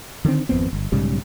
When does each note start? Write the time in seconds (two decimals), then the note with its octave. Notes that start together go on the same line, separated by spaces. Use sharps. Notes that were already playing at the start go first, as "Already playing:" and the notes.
0.25 D3 D#3 G#3 C4
0.49 G#1 F2 B3 C4
0.73 G1
0.92 B1 G#2 C#3 G3